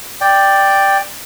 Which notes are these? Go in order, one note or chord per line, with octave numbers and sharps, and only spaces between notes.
D5 G5